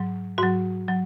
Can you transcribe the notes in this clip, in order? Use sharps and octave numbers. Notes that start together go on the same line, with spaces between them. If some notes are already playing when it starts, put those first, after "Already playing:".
Already playing: G#2 F#3
G#2 F#3 F#4
F#3